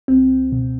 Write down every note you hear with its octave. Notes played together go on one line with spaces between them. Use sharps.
C#2 C4
B2